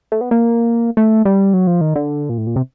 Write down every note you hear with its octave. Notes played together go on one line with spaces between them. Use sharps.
A3
B3
A#3
A3
G3
F#3
F3
D#3
D3
A#2
A2
A#2
C3